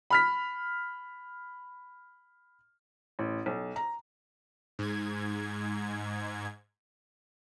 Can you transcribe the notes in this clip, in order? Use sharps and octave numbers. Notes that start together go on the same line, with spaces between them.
B5 F6 B6
A1
B1
A#5
G#2 G#6